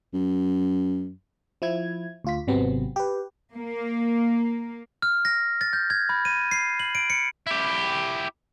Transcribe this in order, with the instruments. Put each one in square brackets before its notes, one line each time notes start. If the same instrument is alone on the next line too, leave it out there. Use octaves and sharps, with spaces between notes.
[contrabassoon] F#2
[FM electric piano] F3 E4 G#6
D2 F4 B6
G#1 C3 F#3 B3 C4
G4 B4
[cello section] A#3
[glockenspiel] F6
A#6
A6
G6
G#6
B5
D#7
C7
F#7
D7
C#7
[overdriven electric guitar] E4 G4